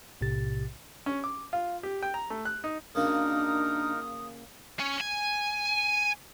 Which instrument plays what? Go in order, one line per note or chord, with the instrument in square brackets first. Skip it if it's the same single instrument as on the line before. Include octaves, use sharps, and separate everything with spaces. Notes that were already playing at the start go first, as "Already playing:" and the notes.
[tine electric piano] B1 A2 C3 G4 A6
[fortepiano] C#4
D6
F4
G4
G5
A#5
A3
F#6
D#4
[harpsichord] C#3 A#3 F#4 [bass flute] D4 [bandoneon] D#4 A#4 [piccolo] D#6
[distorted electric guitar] C#4
G#5